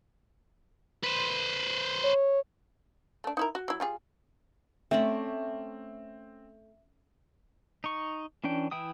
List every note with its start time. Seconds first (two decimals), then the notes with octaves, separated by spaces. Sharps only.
1.03 B4 C5
2.04 C#5
3.24 A3 D4
3.37 D#4 E4 A#4
3.55 F#4
3.68 F#3 E4
3.80 G3 F4 G#4
4.91 A3 C4 C#4 D5 E5
7.84 D#4 C#6
8.44 E3 C#4 D4 G5
8.71 E3 E4 G5 D#6